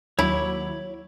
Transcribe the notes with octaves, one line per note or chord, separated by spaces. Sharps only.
D#2 F#3 E4 C#5 B5 D6